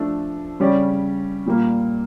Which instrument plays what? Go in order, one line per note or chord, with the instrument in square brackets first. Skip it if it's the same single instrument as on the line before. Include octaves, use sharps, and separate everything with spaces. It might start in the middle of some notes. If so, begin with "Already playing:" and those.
Already playing: [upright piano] F3 A3 D4 A4
C#3 G3 C#4 G4 D5
A#2 G3 A#3